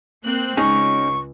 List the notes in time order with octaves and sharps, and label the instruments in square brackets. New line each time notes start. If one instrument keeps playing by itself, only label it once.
[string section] A#3 C4 F#6
[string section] C#2 [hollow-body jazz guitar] C#4 D#4 G#4 [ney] C#6